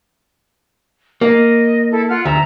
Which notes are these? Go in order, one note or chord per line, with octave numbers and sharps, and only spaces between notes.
A#3 D#5
E4 A4
F4 F#5 F6
D2 E5 A#5